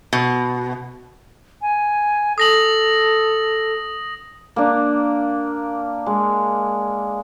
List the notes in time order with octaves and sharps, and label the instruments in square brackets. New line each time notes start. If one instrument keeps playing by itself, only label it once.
[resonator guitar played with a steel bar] B2
[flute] G#5
[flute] A4 [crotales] D#6 A#6 F#7
[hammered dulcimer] A#3 D4
G#3